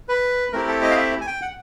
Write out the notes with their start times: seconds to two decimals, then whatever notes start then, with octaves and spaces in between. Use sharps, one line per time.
0.08 B4
0.53 A3 C4 E4 G4 A#4
0.68 A4
0.82 D#5
0.91 F5
0.97 E5
1.21 G#5
1.27 G5
1.42 F#5